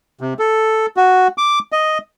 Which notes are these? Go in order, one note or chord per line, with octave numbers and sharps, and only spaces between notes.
C3
A4
F#4
D6
D#5